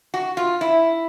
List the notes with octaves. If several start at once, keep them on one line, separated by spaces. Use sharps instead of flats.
F#4
F4
E4